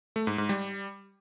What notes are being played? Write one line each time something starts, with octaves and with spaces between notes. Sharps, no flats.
A3
G#2
G#2
G3